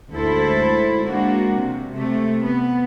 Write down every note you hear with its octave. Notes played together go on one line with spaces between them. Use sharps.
D2 G#2 E4 A4 C5
G#3 A#3 D4 F#4
C3
C3 A3
B3